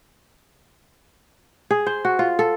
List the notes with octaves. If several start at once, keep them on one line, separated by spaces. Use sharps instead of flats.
G#4
C5
F#4
F4
A4